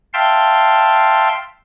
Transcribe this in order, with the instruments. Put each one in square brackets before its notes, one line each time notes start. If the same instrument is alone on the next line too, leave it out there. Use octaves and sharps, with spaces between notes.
[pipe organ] E5 F5 G5 A5 C6